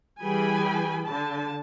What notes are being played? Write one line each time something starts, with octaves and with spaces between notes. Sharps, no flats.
E3 G3 G#4 G5 G#5 B5
D3 A5